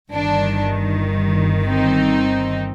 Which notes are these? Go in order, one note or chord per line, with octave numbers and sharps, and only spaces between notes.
G1 G2 D#3 D4
C4 D#4